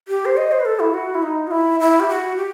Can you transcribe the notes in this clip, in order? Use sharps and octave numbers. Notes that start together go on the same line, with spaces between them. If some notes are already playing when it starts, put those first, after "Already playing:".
G4
C5
D#5
C5
B4
A4
E4
F#4
E4
D#4
F#4
E4
E4
G4
F#4
G4